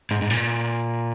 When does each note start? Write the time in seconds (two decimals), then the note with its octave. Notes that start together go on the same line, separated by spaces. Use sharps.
0.11 G#2
0.22 G#2
0.30 A#2